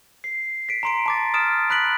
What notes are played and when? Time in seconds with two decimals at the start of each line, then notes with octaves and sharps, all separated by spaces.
0.24 C7
0.69 B6 D7
0.83 A#5 C6 D7
1.06 A5 D6 A6
1.34 D#6 F6 A6 D7 E7
1.70 B5 F#6 B6 D7 F#7